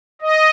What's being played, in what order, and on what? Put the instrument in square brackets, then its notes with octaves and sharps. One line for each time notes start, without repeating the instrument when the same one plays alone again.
[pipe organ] D#5